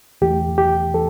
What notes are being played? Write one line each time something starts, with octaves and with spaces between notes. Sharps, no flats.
E2 E3 A3 G4
G4
E3 A4